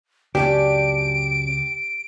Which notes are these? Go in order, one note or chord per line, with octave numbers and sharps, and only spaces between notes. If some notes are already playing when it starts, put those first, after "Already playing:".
C#2 F#2 C#4 D4 G4 D7